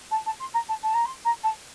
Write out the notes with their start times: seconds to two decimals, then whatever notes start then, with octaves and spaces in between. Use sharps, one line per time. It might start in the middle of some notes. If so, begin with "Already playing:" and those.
0.11 A5
0.26 A5
0.40 C6
0.54 A#5
0.69 A5
0.83 A5
0.94 A#5
1.05 C6
1.25 A#5
1.43 A5